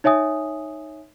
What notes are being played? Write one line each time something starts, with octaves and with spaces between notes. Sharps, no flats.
D#4 C#5 E5 G#5 D#6